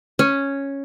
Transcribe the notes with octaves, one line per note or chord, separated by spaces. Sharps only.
C#4